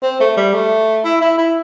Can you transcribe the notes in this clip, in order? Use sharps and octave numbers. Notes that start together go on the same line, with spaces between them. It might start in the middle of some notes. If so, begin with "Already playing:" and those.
C4
A3
G3
A3
E4
E4
E4